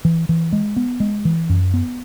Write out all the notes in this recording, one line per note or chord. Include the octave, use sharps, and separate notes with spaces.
E3
E3
G#3
B3
G#3
E3
F#2
B3